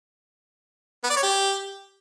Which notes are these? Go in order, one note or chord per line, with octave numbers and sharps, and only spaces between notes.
B3
D5
C#5
G4